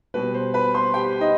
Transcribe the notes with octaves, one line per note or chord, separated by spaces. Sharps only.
B2 G3 B4
C5
B4 B5
C5 C6
G4 G5
D#4 D#5